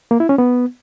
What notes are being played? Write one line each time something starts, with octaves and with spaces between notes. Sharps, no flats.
A#3
E4
C#4
B3